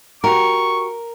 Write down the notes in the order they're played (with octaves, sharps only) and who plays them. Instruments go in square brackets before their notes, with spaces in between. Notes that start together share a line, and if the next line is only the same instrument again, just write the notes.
[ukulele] F#4 G4 E5 [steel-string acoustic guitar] A#4 [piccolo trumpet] C#6